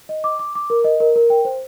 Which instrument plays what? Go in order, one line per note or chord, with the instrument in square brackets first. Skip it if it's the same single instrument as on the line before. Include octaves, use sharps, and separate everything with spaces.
[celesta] D#5
D6
D6
D6
A#4
D#5
A#4
A#4
G5
C5